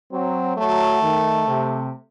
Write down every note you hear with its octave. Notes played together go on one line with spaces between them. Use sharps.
F#3 C4
F#3 A3
D#3
C3